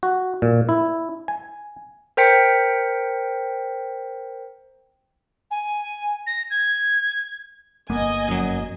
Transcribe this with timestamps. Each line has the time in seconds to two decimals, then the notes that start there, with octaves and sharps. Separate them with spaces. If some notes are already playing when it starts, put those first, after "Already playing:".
0.03 F#4
0.42 A#2
0.69 E4
1.28 G#5
2.17 A#4 C5 G5 B6 C#7
5.51 G#5
6.26 A#6
6.50 G#6
7.90 G1 A#3 B3 D#5 G#5
8.28 F#2 F#3